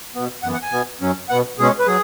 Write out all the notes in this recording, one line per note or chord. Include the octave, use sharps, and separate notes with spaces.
B2 B3
F#2 E3 B3 F#5
F#5
G#5
B2 B3
F#2 F#3 C#4
B2 B3 F#5
B2 G#3 C#4 G#4
B4
F#3 G#4